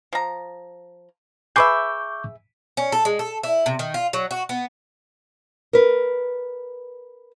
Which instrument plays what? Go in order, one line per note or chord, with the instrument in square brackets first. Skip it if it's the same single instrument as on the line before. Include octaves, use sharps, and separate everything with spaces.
[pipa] F3 A#5
[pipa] G#4 B4 E5 [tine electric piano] C#6 D6 G6
[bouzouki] C#4
A4
G#3
A4
E4
C3
D#3
F4
F#3
F#4
B3
[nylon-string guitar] A#4 B4